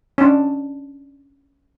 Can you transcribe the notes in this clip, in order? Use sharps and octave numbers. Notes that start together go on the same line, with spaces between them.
C#4 D4